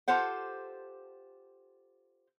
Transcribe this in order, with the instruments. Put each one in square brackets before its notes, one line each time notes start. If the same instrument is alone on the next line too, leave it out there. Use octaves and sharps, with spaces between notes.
[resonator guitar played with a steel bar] F4 G4 A4 C5 F#5